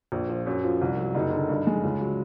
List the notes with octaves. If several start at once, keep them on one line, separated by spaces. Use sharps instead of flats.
A#1
F3
F#2
F3
C2
F#3
F#1 D#4
D3
G2
G#3
C#2
F#3